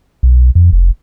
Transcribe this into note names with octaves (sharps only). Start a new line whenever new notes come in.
B1
F2
F1